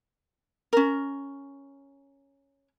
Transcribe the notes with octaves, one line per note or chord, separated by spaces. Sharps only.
C#4 A#4